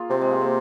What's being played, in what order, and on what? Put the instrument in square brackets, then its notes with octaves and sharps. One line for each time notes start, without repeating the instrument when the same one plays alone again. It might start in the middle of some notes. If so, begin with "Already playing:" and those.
Already playing: [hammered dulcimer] A#3 F4 G#4
[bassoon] C3 [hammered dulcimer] C4
[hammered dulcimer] G#3
A#3
C4